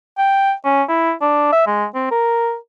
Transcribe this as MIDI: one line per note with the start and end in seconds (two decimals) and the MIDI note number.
0.18 0.53 79
0.65 0.83 61
0.89 1.13 64
1.22 1.48 62
1.52 1.66 76
1.67 1.85 56
1.95 2.09 60
2.11 2.56 70